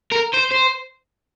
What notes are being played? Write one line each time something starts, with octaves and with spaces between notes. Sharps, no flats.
A#4
C5
C5